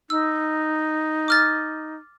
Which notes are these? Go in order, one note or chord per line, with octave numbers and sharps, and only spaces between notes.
D#4 E6
D6 F6 A6